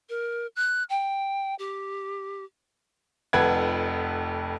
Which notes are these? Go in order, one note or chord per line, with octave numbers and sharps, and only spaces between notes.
A#4
F#6
G5
G4
F1 F2 B4 F#5 B5 G#6